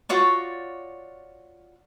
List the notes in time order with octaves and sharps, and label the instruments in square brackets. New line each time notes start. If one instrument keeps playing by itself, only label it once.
[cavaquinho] F4 F#4 C#5 D5